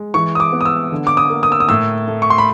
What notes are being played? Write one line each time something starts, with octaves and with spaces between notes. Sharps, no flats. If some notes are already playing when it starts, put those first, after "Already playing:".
Already playing: G#3
E3 C#6
D#6
D6
B3
D#6
E6
D3
D6
D#6
A#3
D#6
E6
D#6
A2 E6
A3
C#6
C6
B5